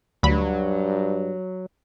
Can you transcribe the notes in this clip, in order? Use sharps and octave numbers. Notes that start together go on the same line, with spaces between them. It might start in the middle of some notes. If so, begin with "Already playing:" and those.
D2 G2 F#3 B5